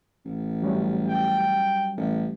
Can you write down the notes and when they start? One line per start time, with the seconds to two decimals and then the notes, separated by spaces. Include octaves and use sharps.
0.25 A1
0.62 F#3 G3 C#4
1.07 G5
1.97 A1